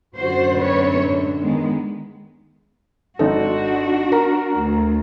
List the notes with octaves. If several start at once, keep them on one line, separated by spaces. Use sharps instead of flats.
F#2 D3 F#4 C5
C4 B4 C#5
G#2
D#3 G#3 B3
G#1 D4 D#4 F#4 A4
A#4 A#5
D2